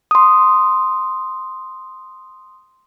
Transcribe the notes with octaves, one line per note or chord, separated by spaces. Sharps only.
C6 D#6